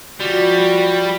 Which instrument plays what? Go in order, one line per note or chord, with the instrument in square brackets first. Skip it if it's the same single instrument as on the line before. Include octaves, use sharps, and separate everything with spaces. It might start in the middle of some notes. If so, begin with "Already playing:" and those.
[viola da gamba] F3 F#4 [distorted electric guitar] G3